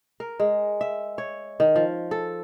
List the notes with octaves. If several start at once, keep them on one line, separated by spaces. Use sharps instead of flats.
A#4
G#3
E5
C#5
D#3
F3
A4